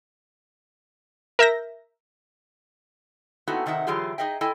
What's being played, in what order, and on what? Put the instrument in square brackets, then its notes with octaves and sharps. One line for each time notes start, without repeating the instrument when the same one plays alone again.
[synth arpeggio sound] A#4 E5 G6 A#6
[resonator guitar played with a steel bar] A3 B3 C4 D#4 E4 F#4
C3 D#3 D#4 E5 F#5
D3 E3 F#3 F4 G4 G#4
D#4 G#4 D#5 E5 G5
E4 A4 D#5 G5 G#5